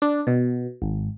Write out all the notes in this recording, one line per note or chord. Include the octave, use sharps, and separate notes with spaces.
D4
B2
G#1